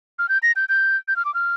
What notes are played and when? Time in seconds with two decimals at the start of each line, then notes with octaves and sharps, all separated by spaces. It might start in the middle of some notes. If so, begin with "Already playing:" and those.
0.19 F6
0.29 G6
0.43 A#6
0.56 G6
0.69 G6
1.08 G6
1.16 F6
1.25 D6
1.34 F6